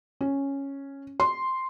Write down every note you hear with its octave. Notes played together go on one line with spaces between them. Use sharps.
C#4
C6